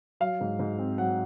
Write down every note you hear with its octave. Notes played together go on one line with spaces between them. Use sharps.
F#3 F5
G#2
G#2
C4
F#3 F#5